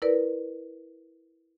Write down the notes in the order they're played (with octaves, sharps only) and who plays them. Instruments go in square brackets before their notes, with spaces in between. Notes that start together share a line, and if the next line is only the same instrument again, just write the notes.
[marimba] E4 A#4 B4 D5